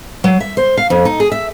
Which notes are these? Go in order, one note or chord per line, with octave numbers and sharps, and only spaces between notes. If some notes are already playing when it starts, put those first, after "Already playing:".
F#3
E5
C5
F5
F2
D#4
G#4
E5